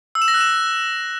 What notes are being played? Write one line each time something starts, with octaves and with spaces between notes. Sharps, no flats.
E6
E7
A#6
F#6
E7